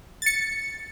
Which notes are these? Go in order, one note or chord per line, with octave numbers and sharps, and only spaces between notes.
A6 C#7